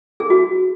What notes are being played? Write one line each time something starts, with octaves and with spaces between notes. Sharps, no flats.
G#4
F#4